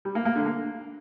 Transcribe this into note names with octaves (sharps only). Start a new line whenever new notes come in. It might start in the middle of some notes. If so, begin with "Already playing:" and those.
G3
A#3
A#3
D3
A#3